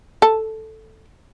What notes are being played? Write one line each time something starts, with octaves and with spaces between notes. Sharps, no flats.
A4